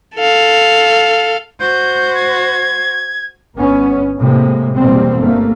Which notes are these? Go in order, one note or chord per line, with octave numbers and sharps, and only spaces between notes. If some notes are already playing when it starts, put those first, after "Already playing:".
A4 F5
F#4 C5 G6
G#6
G1 B3 C#4
A2 C3 G#3 A#3
E2 B2 G3 A#3 C4
G1 A3 A#3